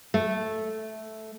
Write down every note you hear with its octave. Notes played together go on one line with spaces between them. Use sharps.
A3